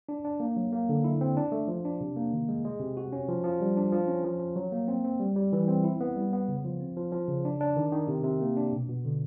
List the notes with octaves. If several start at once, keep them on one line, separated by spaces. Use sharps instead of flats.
D4
D4
A#3
F#3
A#3
D3
E4
C4
D4
A3
F3
D4
C3
A#3
D#3
G#3
G#3
C3
F#4
C#4
F3
F3
G3
D4
F3
C#4
F3
F3
F#3
A#3
C4
C4
G3
G3
E3
C4
E4
B3
G3
B3
C#3
F3
C4
F3
F3
C#3
D4
D4
D#3
D#3
C3
C3
A#3
D4
B2
B2
D3